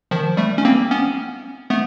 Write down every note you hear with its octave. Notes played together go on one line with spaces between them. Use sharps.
D#3 F3
G3 A3
C#4
A#3 C4
B3 C#4
A3 B3